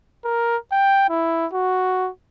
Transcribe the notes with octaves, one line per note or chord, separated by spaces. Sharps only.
A#4
G5
E4
F#4